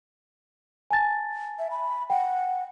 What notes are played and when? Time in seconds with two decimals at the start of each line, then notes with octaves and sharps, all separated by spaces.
0.91 G#5 A5 A6
1.59 E5
1.71 B5
2.10 F#5 G5